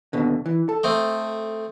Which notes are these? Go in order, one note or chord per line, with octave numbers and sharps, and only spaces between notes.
D#2 B2 D3
E3
A4
A3 C4 D#5